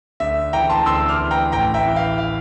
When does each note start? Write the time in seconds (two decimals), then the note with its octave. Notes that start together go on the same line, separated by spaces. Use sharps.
0.20 D2 E5
0.53 E3 G5 A#5
0.69 A5 C6
0.86 D2 C6 E6
1.09 D6 F6
1.20 E3
1.31 G5 A#5
1.52 A1 G5 A#5
1.74 E5 G5
1.85 E3
1.96 F5
2.18 F5